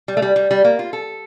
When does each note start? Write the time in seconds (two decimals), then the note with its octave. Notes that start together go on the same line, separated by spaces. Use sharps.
0.08 G3
0.17 A3
0.22 G3
0.36 G3
0.51 G3
0.65 A#3
0.79 F4
0.93 A4